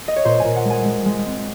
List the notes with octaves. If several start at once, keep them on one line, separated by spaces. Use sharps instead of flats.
D#5
C#5
A#2 C5
G#5
A#2
F#5
G#3
G#5
G#3
G#3
C4